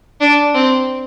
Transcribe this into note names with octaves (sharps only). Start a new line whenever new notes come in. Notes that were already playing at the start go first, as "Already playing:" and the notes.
D4
C4